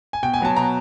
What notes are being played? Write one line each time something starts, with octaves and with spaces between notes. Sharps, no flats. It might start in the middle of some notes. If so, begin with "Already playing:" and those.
G#5
B2 G5
G#5
F#3 B3 A5
B2 A#5